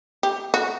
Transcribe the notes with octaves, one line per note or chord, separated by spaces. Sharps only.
G4
F#4